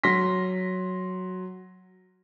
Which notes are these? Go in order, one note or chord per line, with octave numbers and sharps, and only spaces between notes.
F#3 C6 A#6 B6